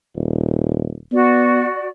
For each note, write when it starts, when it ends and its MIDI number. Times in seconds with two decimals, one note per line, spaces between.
0.16 0.98 27
1.12 1.65 59
1.12 1.88 66
1.12 1.88 74